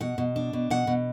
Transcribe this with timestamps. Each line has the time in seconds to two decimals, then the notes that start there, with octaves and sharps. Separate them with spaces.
0.01 B2 F#5
0.18 B2
0.36 D4
0.53 B2
0.70 B2 F#5
0.87 B2